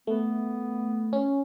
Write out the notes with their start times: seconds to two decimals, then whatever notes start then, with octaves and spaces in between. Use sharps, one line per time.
0.07 A3 B3
1.13 C#4